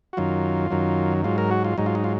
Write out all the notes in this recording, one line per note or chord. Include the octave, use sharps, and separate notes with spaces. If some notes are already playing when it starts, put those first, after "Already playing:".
F#4
F#2 D#3 F#3 F4
F#2 D#3 F#3
G#2 F#3 F4
A#4
F#4
F4
G#2 F#3 D#4
F4
D#4
F4